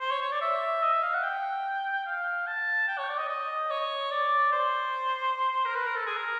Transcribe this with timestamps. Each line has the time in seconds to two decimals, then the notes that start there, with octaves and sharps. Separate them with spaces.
0.01 C5
0.11 C#5
0.22 C#5
0.32 D5
0.41 E5
0.83 D#5
0.93 E5
1.03 F5
1.14 F#5
1.23 G5
2.06 F5
2.47 A5
2.88 G5
2.98 C#5
3.09 D5
3.18 D#5
3.29 D#5
3.70 C#5
4.11 D5
4.52 C5
5.65 A#4
5.75 B4
5.86 A#4
5.96 A4
6.06 G#4
6.16 A#4